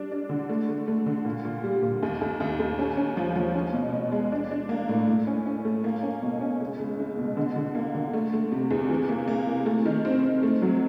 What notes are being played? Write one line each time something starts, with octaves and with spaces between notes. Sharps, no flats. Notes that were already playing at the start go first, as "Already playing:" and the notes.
Already playing: G3 D4
D4
D3
A3
A3
A3
D3
A#2
A#2
G3
A#2
D#2
D#2
D#2
D#2
C#4
C#4
F3
F3
C#4
B2
B2
G#3
D4
D4
A#3
A2
A2
C#4
C#4
A3
A#3
C#4
B2
C#4
C#2
C#2
C#2
B2
D3
D3
A#3
D3
A3
A3
C3
E2
E3
A#3
A#3
C3
A3
D#3
C4
C4
A3
F#3